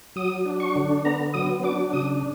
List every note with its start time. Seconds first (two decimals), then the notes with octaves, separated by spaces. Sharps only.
0.16 F#3 D#6
0.46 D4
0.60 C#6
0.76 D3
1.05 B3 A#5
1.34 F#3 D#6
1.63 D4 D6
1.93 C#3 D#6